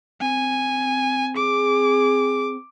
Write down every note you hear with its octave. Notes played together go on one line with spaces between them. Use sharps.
C4 G#5
G#4 D6